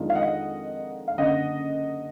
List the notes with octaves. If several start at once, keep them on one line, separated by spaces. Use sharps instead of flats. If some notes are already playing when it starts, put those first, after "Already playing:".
Already playing: F2 D#3 G#3 D4 F4
F5
D#5 F#5
F5
F#1 F#2 D3 D#5 F#5